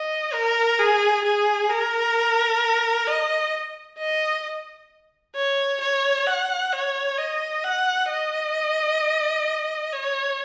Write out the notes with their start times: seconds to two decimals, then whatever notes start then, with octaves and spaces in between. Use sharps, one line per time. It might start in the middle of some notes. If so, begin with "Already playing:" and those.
Already playing: D#5
0.33 A#4
0.79 G#4
1.25 G#4
1.70 A#4
3.07 D#5
3.98 D#5
5.36 C#5
5.81 C#5
6.27 F#5
6.72 C#5
7.18 D#5
7.64 F#5
8.09 D#5
9.92 C#5